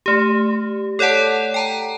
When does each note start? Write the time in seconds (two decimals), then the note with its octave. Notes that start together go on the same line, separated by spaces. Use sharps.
0.06 A3 G4
0.99 A4 C#5 D5 F#5 A5
1.54 G5 A5 A#5